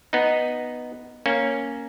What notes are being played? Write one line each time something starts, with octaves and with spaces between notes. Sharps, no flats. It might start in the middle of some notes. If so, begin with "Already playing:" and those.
B3 D#4
A#3 C#4